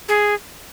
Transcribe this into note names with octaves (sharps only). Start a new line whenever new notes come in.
G#4